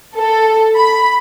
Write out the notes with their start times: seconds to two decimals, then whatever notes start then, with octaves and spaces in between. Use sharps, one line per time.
0.15 A4
0.76 B5